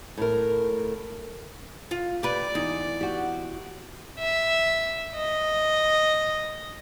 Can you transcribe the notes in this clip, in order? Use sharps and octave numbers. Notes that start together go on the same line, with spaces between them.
A2 A#4
F4
G4 B4 D5
E2 D#4
F#4 G4
E5
D#5